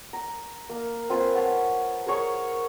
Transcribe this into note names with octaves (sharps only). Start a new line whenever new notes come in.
A#5
A#3
C4 F4 B4 G#5
B4 C#5 F#5 A5
G#4 A#4 C#5 C#6